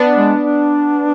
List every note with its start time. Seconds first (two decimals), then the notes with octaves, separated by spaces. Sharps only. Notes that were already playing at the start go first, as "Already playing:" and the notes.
Already playing: B3 D4
0.14 G#3
0.42 D4